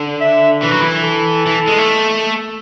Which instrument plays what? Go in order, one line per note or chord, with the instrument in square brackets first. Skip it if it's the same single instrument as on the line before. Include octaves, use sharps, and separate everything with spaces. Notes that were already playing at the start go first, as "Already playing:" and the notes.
Already playing: [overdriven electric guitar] D3
[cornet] E5
[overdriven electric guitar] E3 [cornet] B4
[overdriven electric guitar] F#3
E3
[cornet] A4
[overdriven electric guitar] E3
G#3
A3